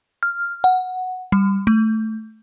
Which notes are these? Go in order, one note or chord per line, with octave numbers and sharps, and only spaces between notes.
F6
F#5
G3
A3